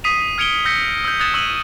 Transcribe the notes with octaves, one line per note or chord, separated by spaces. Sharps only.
D#6 B6 C7 D#7 F7
F6 G#6 C#7 D7 F7 G7
E6 G6 A#6 B6 C#7
E6 G6
D#6 F#6 G#6 A6 C#7 E7
C#6 E6 G6 D#7 F#7